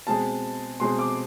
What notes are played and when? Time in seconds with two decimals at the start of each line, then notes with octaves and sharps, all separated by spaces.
0.07 B2 G#3 C4 A5
0.80 B2 G#3 C4 C6
0.99 D6